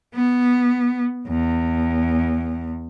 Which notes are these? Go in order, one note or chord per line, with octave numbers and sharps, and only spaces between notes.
B3
E2